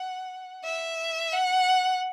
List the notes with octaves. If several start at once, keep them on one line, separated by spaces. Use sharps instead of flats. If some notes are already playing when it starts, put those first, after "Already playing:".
Already playing: F#5
E5
F#5